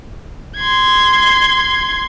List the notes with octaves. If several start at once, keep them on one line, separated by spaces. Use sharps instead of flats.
C6 G#6